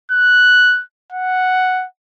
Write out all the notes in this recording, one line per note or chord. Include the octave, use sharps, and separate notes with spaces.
F#6
F#5